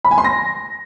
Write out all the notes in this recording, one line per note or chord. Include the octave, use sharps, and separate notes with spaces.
B5
G#5
C6
A#6